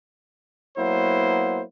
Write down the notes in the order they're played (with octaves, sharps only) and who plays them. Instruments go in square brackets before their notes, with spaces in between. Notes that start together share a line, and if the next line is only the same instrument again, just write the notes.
[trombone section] F#3 A#3 B3 E4 C5